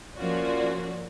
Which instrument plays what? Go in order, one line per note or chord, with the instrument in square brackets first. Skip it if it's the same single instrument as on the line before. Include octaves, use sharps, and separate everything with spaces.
[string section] F3 A#3 C#4 F4 F#4 D5